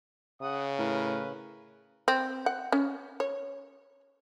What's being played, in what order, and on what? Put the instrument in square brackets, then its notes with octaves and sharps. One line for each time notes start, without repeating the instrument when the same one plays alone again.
[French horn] C#3 [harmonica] F#5 D#6
[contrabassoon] A2 [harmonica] A#4 B4
[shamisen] C4
F#5
C#4
C#5